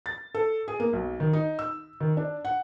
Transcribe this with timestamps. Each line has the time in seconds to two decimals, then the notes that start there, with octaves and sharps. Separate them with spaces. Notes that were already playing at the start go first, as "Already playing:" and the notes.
0.06 A6
0.35 A4
0.68 G#4
0.80 A#3
0.93 B1
1.20 D#3
1.33 D#4
1.59 E6
2.01 D#3
2.17 D4
2.45 F#5